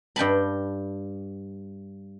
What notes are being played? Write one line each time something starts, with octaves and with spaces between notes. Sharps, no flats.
G2 G5 A5 B5